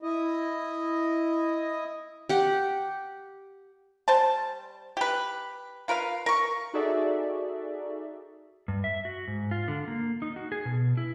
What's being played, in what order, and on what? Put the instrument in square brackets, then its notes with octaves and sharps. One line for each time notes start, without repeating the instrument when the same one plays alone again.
[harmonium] E4 D#5
[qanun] G4 F#5
[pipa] G3 C5 A5
G4 B4
F4 A#4 B4 F5
A#4 C#6
[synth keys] D#4 F#4 G#4 A4 D5 E5
[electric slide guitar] G2
E5
F#4
G#2
F4
D3
A#3
D#4
F#4
G#4
B2
E4